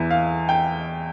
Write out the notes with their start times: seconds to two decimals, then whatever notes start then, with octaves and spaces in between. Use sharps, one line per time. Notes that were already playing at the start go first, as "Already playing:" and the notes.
Already playing: E2 E3 E5
0.10 F5
0.49 G5